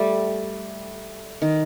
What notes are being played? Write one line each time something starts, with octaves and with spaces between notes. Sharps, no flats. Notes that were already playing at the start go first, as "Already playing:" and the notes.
Already playing: G3 A3
D#3